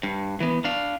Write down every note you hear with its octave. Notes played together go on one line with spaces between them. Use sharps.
G2
E3 B3
D4 F5